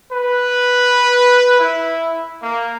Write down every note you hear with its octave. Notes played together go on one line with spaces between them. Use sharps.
B4
E4
A#3